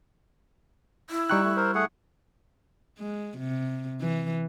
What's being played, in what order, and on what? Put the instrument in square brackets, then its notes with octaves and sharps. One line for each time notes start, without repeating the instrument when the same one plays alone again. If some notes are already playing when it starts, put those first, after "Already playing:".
[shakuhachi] E4
[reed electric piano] G3 C#6 F#6 [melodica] D#4 G5
[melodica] A3
A#4 C5
A3 G#4 F#5
[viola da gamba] G#3
C3
E3